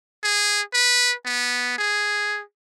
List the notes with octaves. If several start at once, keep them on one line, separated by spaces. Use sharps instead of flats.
G#4
B4
B3
G#4